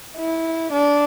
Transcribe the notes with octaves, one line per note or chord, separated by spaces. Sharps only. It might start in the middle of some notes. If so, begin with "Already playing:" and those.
E4
D4